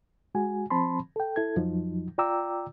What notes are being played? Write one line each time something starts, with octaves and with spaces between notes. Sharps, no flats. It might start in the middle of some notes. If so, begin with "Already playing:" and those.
G#3 F#4 G#5
F3 C4 A5 B5 C6
A4 G5
E4 A4 G#6
F2 F3 F#3 D#4
F4 D5 G5 A#5 D6 E6